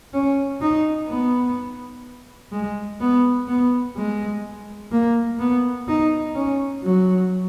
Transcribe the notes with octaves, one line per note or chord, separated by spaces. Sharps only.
C#4
D#4
B3
G#3
B3
B3
G#3
A#3
B3
D#4
C#4
F#3